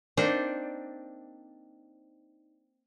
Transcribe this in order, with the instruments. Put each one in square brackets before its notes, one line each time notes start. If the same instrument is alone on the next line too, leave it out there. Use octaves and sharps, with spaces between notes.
[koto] A#3 C4 D4 D#4 C5 D5